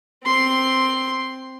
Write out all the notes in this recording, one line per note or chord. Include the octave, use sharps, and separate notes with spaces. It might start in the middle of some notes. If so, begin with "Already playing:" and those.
C4 C6